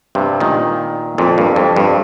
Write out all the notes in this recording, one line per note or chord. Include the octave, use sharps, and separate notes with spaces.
G2 C3
A#2 D#3
F2 A#2
G2
F2
G2